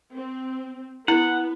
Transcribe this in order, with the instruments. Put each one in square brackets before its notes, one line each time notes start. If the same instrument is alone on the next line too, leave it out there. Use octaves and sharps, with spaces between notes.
[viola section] C4
[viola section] B3 [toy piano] E4 [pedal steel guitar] F#5